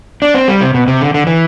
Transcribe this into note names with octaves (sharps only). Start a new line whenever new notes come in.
D4
C4
G3
C3
B2
C3
D3
D3
E3